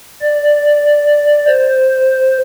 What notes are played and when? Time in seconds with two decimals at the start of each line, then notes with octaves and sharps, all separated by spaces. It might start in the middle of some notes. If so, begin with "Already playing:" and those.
0.22 D5
1.47 C5